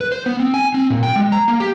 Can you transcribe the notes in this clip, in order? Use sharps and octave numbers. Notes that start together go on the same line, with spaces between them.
B4
C5
B3
C4
G#5
C4
A#2
G5
G#3
A#5
A#3
G4